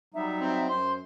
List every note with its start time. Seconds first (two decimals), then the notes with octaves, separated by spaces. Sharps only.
0.14 F#3 G3 D#4 E5
0.41 C4
0.69 F#2 C5 C6